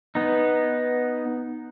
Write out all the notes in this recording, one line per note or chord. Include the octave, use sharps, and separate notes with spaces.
B3 D#4